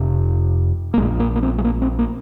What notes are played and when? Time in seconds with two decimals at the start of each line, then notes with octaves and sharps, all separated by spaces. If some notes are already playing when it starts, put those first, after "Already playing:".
Already playing: F1 F2 C3
0.94 A#3
0.98 A#1 G#3
1.02 A#2
1.20 A#3
1.36 A#3
1.43 C4
1.58 G#3
1.64 A#3
1.82 C4
1.99 A#3